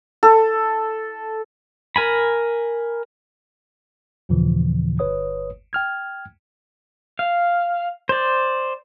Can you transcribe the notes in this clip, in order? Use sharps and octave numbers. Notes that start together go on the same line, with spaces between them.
A4
A#4 G#5 B5
D#2 A#2 C#3 E3 F3
G1 B4 C#5 D#6
G5 F6 G#6
F5
C5 D5